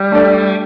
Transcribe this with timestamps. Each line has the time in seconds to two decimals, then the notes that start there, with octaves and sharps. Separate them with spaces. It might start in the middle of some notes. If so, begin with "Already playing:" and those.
Already playing: G3
0.11 A3 D4 A4 D5